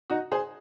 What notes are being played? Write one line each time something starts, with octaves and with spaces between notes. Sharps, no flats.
D#4 F#4
G#4 C5